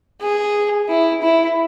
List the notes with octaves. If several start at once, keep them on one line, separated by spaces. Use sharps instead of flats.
G#4
E4
E4